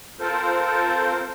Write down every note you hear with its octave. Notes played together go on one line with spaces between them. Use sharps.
C4 F4 A4 A#4 C5